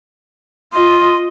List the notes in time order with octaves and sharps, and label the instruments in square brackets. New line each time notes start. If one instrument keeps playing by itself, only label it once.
[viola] F4 D#5 [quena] C6